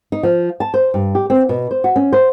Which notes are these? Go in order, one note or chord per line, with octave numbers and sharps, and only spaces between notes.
D#4
F3
A5
C5
G2
G4
C4
B2
C5
F#4
C#4
C5